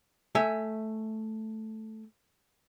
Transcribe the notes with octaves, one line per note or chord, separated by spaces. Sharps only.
A3 E5 G#5